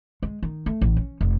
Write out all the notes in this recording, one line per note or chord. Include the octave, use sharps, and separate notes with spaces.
G#3
D#3
A3
A1
C#4
F1